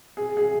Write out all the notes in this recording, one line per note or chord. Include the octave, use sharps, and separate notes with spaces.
G#4
G#4